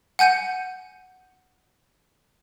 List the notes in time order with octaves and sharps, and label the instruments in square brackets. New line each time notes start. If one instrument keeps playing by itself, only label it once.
[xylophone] F#5 G#5 G6 C#7 D#7